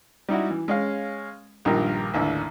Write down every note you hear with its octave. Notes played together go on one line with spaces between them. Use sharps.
G3 D#4 E4 F#4
E3
G#3 C#4 F5
A#1 G2 D#3 F4 G4 A#4
A1 D#2 D3 E5